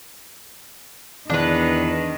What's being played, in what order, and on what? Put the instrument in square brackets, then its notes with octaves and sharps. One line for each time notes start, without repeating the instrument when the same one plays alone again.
[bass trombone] E2 [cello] D#3 [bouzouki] D4 B4